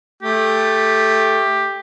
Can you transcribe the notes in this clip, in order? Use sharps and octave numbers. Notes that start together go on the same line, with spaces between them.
A3 G4